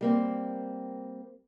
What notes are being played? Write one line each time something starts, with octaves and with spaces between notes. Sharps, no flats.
G3 A#3 C4